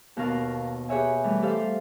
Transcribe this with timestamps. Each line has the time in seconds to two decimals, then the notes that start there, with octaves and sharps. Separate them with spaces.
0.17 D#2 B2 A#4 F5 A5
0.89 G4 G#4 B4 C#5 E5 G#5
1.24 E3 G3 A3
1.42 G4 A4 C5 E5 F5